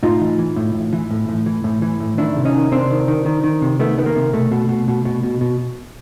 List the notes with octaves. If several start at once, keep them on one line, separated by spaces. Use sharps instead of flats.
A2 D#4 F4
E3
E3
A2
A2
E3
A2
A2
E3
A2
E3
A2
D#3 D4 E4
C3
C#4 D#4
D#3
C3 C4 D4
D#3
D#3
D#3
D#3
C3
D#3 A3 B3
D#3 B3
A#3
C3
B2 A3
B2
B2
B2
B2
B2
B2